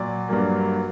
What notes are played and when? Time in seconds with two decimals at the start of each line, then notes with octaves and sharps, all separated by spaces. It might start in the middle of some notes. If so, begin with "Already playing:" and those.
Already playing: A#2 F#3 D5
0.29 G2 F#3 A#3